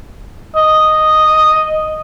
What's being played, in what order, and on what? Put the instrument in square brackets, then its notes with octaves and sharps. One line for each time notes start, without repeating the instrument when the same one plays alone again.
[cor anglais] D#5